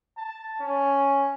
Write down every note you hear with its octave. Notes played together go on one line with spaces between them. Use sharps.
A5
C#4